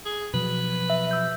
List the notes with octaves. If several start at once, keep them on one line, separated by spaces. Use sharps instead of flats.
G#4
B2 F3 F#3 B4
E5
E6 G6